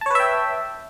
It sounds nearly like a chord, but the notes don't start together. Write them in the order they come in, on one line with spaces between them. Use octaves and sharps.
A5 C#5 B4 E5 G5